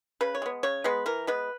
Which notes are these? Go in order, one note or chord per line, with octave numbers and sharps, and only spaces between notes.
C#3 B4
C#5
G#3 B3
C#3 C#5
G#3 B3 B4
E3 A#4
G#3 B3 B4